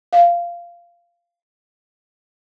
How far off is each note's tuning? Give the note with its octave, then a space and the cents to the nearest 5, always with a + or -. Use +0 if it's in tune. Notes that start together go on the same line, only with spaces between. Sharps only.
F5 -15